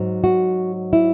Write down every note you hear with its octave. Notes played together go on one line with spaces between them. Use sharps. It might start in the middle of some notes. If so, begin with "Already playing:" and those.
Already playing: G#2 F#3
F#4
E4